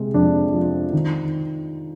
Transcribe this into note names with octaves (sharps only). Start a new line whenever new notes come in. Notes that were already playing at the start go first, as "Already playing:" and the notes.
Already playing: C3 G#3
F2 D4
F3
D#3